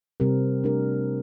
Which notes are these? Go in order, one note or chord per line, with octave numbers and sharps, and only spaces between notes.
C3 G3 C4 G4 A#4
A3 D4 G4 A#4